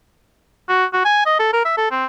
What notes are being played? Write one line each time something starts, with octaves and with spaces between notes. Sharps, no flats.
F#4
F#4
G#5
D#5
A4
A#4
E5
A4
C4